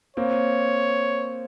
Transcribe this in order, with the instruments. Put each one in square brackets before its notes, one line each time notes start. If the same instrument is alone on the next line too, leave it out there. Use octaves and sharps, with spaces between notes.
[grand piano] A#3 C4 [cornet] C#5